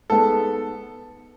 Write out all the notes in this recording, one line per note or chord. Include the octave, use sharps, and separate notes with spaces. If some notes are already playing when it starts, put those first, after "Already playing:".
G#2 G#3 B3 A4